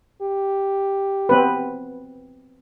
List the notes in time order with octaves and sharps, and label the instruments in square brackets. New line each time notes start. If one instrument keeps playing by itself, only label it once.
[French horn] G4
[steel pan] B3 C4 B4